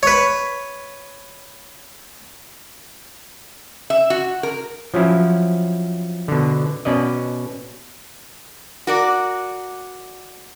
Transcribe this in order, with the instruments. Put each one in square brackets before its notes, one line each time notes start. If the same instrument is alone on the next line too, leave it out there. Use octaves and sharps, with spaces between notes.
[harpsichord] B4 C#5
[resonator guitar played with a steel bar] E5
F#4
A#4
[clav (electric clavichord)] F3 F#3 C#4 E4
B2 D3
B2 C#4 D5 D#5
[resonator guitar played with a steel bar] F#4 A#4 D5